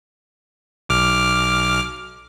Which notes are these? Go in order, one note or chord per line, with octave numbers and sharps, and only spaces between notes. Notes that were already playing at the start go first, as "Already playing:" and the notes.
B1 D6 F6